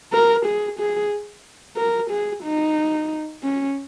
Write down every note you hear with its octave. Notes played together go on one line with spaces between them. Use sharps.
A#4
G#4
G#4
A#4
G#4
D#4
C#4